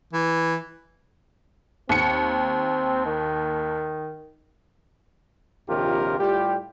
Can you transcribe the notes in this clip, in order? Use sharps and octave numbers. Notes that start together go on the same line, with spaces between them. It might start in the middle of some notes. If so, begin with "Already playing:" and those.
E3
D#2 C4 C#7
D#3
A#1 D#2 C3 F4 G4 A#4
A2 G3 F4 G4